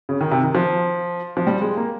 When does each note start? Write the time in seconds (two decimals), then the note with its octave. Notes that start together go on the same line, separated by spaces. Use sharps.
0.09 C#3
0.21 D#3
0.31 C3
0.44 D#3
0.55 F3
1.37 F3
1.47 G3
1.62 G#3
1.77 A#3